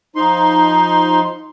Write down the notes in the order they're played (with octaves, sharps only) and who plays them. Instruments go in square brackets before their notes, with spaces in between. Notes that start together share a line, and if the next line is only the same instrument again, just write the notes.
[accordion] F3 D#4 C6